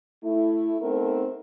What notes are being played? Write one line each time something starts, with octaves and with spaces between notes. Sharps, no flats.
A3 E4
A3 B3 C4 D#4 A#4